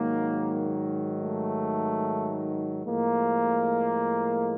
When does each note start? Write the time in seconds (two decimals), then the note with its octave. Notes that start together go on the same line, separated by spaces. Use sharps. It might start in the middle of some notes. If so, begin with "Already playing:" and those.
Already playing: G#2 D#3 F#3 A#3
1.19 A3
2.85 A2 F3 G#3 A#3